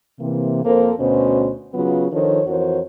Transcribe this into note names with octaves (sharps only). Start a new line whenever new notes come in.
C3 E3 A#3
F2 A#3 A4 A#4 C5
D2 B2 C#4 C5
C#3 F#3 B3 F4
D#3 F3 D4 A4 C5 C#5
F2 E3 F#4 A#4 C5 C#5